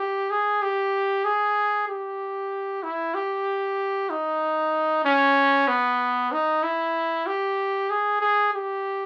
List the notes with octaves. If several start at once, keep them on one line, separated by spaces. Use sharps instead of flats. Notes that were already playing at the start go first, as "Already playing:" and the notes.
Already playing: G4
G#4
G4
G#4
G4
E4
G4
D#4
C#4
B3
D#4
E4
G4
G#4
G#4
G4